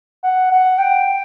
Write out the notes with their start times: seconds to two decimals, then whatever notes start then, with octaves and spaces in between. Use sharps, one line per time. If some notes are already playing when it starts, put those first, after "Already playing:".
0.23 F#5
0.51 F#5
0.78 G5